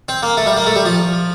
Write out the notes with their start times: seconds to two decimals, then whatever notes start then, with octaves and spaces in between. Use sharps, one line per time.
0.09 C4
0.23 A#3
0.37 A3
0.46 G3
0.57 A#3
0.66 A3
0.76 G3
0.86 F3